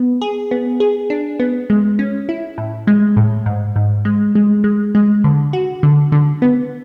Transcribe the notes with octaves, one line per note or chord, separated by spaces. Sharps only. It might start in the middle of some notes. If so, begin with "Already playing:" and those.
Already playing: B3
G#4
B3
G#4
D4
B3
G#3
C#4
E4
A2
G#3
A2
G#2
G#2
G#3
G#3
G#3
G#3
D3
F#4
D3
D3
B3